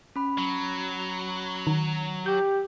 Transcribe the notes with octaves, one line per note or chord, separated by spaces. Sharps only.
C#4 B5
F#3
D#3
G4 G6